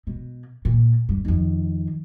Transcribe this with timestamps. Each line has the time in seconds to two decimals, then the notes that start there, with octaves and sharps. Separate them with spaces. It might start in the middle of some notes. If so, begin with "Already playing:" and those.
0.07 B2
0.65 A#2
1.09 G2
1.25 F2 D#3